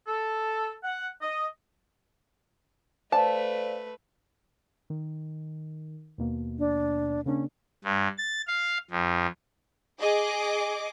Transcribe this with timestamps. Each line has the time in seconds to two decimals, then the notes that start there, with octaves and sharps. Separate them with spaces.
0.07 A4
0.84 F#5
1.22 D#5
3.12 A3 B4 C5 D5 F5 A5
4.90 D#3
6.18 D#2 B2 A#3
6.59 D4
7.26 C#3 A#3 C#4 D4
7.84 G2
8.18 A6
8.47 F5
8.91 F2
10.00 G#4 D#5 D6